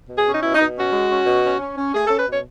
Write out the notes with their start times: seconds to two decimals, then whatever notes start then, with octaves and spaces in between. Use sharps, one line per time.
0.09 B2
0.18 G#4
0.26 C#4
0.34 D#4
0.42 B2 E4
0.55 D#4
0.59 B2
0.76 C#4 F#4
0.92 G#3
1.09 C#4
1.26 B2
1.43 C#4
1.59 C#4
1.77 C#4
1.93 A3 G#4
2.06 A4
2.11 C#4
2.18 B4
2.27 B2 C#5